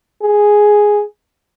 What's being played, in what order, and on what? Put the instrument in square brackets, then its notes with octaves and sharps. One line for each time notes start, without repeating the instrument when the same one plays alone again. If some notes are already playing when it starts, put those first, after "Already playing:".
[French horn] G#4